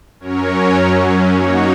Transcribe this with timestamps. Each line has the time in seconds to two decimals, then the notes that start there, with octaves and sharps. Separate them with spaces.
0.19 F#2 F#3 C#4 A#4 C#5
0.76 F#2 F#3 C#4
1.34 F#3 A#3 D#4 F#4 C#5